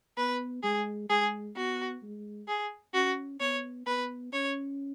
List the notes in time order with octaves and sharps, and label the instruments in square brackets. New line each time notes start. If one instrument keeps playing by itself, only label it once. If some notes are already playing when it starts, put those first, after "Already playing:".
[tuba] B3 [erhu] B4
[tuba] G#3 [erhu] G#4
[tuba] G#3 [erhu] G#4
[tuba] B3 [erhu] F#4
[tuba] G#3
[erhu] G#4
[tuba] C#4 [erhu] F#4
[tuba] B3 [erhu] C#5
[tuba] B3 [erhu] B4
[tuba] C#4 [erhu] C#5